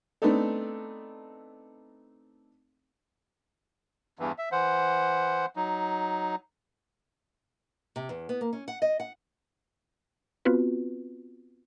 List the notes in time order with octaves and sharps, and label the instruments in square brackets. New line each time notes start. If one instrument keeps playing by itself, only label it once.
[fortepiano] A3 B3 C4 D4 D#4 A4
[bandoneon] E2 G2 E3
E5
E3 C5 F#5
F#3 D#4
[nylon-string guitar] C3
E2
B3
A#3
C#4
F#5
D#5
F#5
[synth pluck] B3 C4 F4 F#4 B4